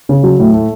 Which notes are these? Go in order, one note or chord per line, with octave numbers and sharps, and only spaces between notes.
C#3
F#3
A2
A3